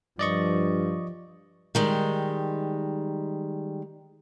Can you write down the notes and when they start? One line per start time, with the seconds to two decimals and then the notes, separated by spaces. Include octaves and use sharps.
0.19 G2 F3 D5 D#5 C#6
1.75 D#3 G3 G#3